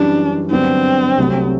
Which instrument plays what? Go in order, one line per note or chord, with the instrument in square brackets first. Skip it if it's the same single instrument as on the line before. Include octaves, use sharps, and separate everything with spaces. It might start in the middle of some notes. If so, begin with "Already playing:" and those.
Already playing: [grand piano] F#2 E3 G3 [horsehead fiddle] D4
[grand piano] G2 D3 F#3 B3 D4 [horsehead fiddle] C4
[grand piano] C2 C3 F#3 A3